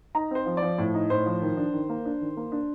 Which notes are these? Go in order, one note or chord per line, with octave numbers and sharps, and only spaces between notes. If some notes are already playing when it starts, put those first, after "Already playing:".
D#4 A#5
C4 C5
F3
D5
F3
A2
D#4
A2 C5
F3
D#3
D4
D#3
A#3
D4
D#3
A#3
D4